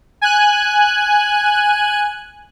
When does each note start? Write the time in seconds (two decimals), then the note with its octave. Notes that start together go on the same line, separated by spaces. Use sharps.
0.21 G#5 F#6